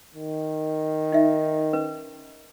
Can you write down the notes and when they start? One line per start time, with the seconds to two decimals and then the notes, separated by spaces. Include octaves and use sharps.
0.14 D#3
1.12 D#4 D#5 E5
1.73 C#4 B4